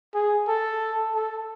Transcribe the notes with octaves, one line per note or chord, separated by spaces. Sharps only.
G#4
A4
A4